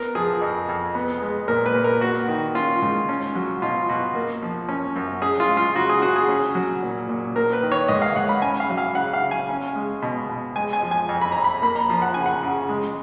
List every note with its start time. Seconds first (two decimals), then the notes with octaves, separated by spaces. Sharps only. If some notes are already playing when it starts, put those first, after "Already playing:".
Already playing: B3 A#4
0.15 F3 G#4
0.41 F2
0.69 F2
0.95 B3
1.22 G#3
1.48 A#2 A#4
1.66 B4
1.75 A#2
1.84 A#4
2.01 A#3 F#4
2.28 D#3
2.55 C#4 F4
2.82 G#2
3.09 C#4
3.35 F#3
3.62 B2 F4
3.89 B2 F#4
4.15 A#3
4.42 F3
4.69 C#4
4.96 F#2
5.22 C#4 G#4
5.40 F4
5.48 G#3
5.57 F4
5.75 C#3 F#4
5.89 G#4
6.02 C#3 F#4
6.16 G#4
6.28 C#4
6.55 F#3
6.83 A#2
7.09 A#2
7.36 A#3 A#4
7.53 B4
7.63 D#3
7.72 C#5
7.88 G#2 D#5
8.02 F5
8.16 G#2 F#5
8.29 B5
8.42 C#4 G#5
8.60 F5
8.69 F#3
8.78 F5
8.95 C#3 F#5
9.13 F5
9.22 C#3
9.31 G#5
9.49 C#4
9.76 G#3
10.02 B2
10.29 B2
10.56 G#3 G#5
10.73 G#5
10.83 F3
10.91 G#5
11.09 F2
11.21 B5
11.32 F2 A#5
11.44 B5
11.62 A#3 B5
11.76 A#5
11.89 F3 A#5
12.02 F#5
12.14 C#3 G#5
12.26 F#5
12.43 C#3
12.69 G#3